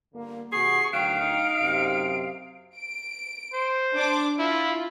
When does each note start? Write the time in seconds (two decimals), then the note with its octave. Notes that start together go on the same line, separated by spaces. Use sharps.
0.12 G1 D3 A#3
0.52 C3 E3 F#4 G#4 C#6 C7
0.93 D2 D#3 F#3 F5 G5 D7
1.21 D#4
1.59 F#2 C3
2.76 D7
3.53 C5
3.95 D4 D6
4.39 E4 F4